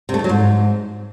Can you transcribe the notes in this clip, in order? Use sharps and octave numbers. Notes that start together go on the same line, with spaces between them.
C3
A3
D#3
F#3
G#2